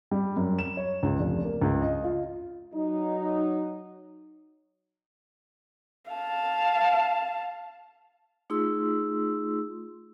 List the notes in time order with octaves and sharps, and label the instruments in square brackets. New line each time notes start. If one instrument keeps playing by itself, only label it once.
[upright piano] G3
F#2
E7
C#5
C#2
F1
A#3
C#2
D#5
F4
[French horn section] F#3 D#4
[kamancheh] F5 A5
[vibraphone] A3 D#4 F4 G#4 C6 E6